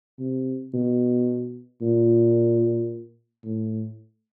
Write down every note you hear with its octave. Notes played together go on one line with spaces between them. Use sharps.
C3
B2
A#2
A2